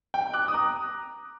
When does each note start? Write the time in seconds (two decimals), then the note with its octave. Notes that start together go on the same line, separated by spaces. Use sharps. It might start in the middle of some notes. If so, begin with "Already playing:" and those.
0.14 G5
0.34 D6 F#6
0.48 D#6
0.54 A#5 D6